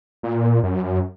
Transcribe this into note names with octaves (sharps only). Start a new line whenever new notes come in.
A#2
F#2